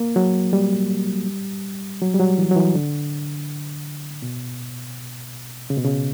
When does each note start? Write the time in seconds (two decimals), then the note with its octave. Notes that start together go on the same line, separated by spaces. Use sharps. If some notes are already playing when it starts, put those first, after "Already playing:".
Already playing: A#3
0.16 F#3
0.53 G3
2.01 F#3
2.14 G3
2.20 F#3
2.38 E3
2.51 F#3
2.56 E3
2.75 D3
4.22 B2
5.70 C#3
5.77 B2
5.84 C#3